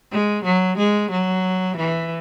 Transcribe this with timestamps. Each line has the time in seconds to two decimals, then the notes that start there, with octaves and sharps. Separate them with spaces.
0.12 G#3
0.45 F#3
0.78 G#3
1.11 F#3
1.77 E3